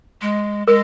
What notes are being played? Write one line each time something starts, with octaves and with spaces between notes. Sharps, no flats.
G#3
G#3 A#4